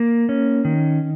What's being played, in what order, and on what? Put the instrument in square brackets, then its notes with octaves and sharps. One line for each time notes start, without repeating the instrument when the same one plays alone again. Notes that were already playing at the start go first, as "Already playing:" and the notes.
Already playing: [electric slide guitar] A#3
C#4
D#3